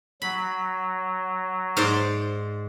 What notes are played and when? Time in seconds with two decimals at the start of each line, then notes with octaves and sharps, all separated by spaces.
0.22 F#3 B5
1.77 G#2 C5 D5